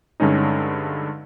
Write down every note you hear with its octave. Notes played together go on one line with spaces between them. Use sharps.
G2 D3 G#3 C#4 D#4